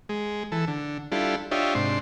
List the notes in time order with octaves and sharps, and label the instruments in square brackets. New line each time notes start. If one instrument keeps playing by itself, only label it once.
[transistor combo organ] G#3
E3 A4
D3
G3 D4 E4 F4 A4
D4 F4 G4 C#5 D#5 E5
G#2 C3 D4 C6